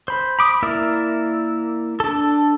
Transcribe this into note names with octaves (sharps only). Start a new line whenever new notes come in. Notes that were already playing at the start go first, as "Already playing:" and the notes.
C5 B5
B5 D6 D#6
A#3 E4 A#4 D5 E5
D4 A4